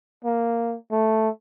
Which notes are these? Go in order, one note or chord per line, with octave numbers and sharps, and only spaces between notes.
A#3
A3